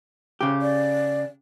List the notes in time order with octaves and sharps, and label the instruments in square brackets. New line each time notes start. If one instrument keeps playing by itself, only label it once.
[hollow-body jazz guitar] C#3 G4
[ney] D5